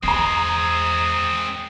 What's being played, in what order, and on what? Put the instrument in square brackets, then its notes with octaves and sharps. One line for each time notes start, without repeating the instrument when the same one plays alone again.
[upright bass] E2 [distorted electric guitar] G#3 C4 [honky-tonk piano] A#5 C7 [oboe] D#6